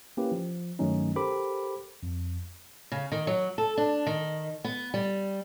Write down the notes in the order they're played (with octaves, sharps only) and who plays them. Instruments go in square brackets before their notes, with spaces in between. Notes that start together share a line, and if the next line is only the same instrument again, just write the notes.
[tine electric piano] A#3 C#4 E4 G4 B4
F3
G2 D#3 F#3 A3 C#4 D#4
G4 A4 A#4 C5 B5 D6
F2
[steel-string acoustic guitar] C#3
D#3
F#3
A4
D4
D#3
B3
G3